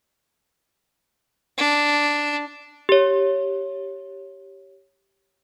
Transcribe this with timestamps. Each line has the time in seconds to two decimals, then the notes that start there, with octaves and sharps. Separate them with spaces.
1.58 D4
2.89 G4 C#5